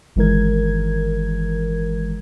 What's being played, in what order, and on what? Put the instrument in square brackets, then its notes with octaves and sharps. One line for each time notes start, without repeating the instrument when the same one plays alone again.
[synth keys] G1 D#3 E3 G#3 A#4 G#6